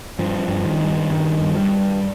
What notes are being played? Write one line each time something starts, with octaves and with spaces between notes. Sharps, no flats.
G2 F3
G2
D#3
G2
G2 D#3
G2
F3
G3
G2